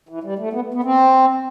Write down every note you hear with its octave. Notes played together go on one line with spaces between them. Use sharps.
E3
G3
A3
B3
B3
C4